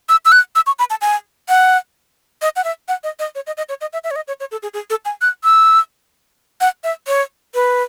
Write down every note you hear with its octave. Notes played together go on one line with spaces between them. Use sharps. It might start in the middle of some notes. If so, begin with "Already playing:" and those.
E6
E6
F#6
E6
C#6
B5
A5
G#5
F#5
D#5
F#5
E5
F#5
D#5
D#5
C#5
D#5
D#5
C#5
D#5
E5
E5
C#5
D#5
C#5
C#5
A4
G#4
G#4
A4
G#5
F#6
E6
F#5
E5
C#5
B4